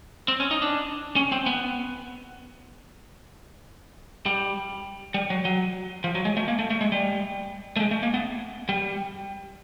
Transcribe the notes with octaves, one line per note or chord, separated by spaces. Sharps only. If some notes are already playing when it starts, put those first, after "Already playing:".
C4
C#4
D#4
D4
C#4
C4
B3
G3
G3
F#3
F#3
F3
F#3
G#3
A3
A#3
A3
A3
G#3
G3
A3
G#3
A3
A#3
B3
G3